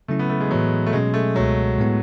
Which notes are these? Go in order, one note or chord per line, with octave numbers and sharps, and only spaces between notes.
C#3 F#3 A3 C#4 E4
B3
A3
G#3
A2 E3 F#3 B3
A3
B2 F#3 G#3 C#4
A3
C#2 B2 F#3 G#3
A2 G#3 B3 E4